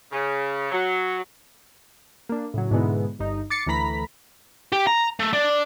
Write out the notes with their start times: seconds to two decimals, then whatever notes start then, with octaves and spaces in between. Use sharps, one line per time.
0.11 C#3
0.72 F#3
2.29 A#3 D4
2.54 A2 C#3 F#3
2.71 G#2 B2 D3 G#3 B3 E4
3.19 G1 G2 D#4
3.50 D6 A6 C7 C#7
3.67 D2 E3 A3 A#5 B5 B6
4.72 G4
4.87 A#5
5.20 A3
5.33 D4